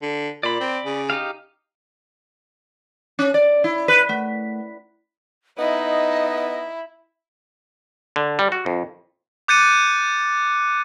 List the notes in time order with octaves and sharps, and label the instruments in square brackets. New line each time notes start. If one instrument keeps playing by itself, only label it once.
[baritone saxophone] D3
[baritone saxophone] A#2 [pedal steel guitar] D5 B5
[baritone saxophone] C4
C#3
[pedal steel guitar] D#4 G4 F5
[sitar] C#4
D5
E4
B4
A3
[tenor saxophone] B3 [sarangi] D#4 [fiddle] E4 [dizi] D#5
[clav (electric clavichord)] D3
G3
F#4
F2
[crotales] D6 F#6 G6 A6 C#7 D#7